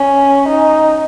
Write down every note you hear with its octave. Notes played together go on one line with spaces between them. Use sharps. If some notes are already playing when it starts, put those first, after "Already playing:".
Already playing: C#4
D#4